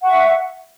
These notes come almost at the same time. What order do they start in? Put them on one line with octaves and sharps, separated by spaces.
F#5 C#6 E5